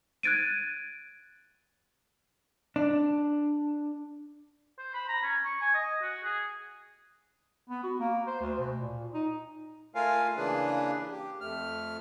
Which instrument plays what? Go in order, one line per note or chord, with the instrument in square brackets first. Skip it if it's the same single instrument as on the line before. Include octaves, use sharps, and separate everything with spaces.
[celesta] F#6 G#6 A6 D7 D#7
[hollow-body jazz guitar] D4
[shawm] C5
B5
A#5
C#4
C#6
G#5
D#5
F#4
G#4
[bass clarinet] B3
F#4
A#3
C5
D2
B2
A#2
D#4
[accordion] A3 F4 A#4 F5 G#5
C#3 E3 A#3 D4 G#4 B4
G4
F2 A3 F6